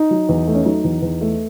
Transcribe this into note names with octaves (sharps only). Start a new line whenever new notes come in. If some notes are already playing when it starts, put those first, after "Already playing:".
Already playing: D#4
F#3
E2
A3
C#4
F#3 D#4
E2
E2
A3